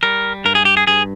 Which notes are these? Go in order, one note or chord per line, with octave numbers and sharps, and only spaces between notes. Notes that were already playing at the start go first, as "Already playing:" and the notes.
G3 A#4
G2 A#4
G#4
G4
G#4
G2 G#4